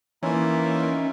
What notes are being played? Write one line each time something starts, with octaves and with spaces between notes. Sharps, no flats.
E3 A#3 C#4 D#4 F4 E5